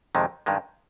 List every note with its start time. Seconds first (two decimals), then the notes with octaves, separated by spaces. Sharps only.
0.15 F2 C3 D#3 G#3
0.46 G2 D#3 G#3